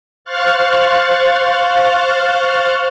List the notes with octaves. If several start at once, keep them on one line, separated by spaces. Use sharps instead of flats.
C5 F5 C#6 F6 F#6 A6